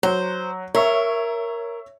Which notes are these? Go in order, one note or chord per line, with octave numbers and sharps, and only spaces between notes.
F#3 C5
A#4 C#5 E5 C#6